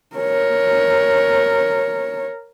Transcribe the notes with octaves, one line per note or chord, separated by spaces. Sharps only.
A#4 C#5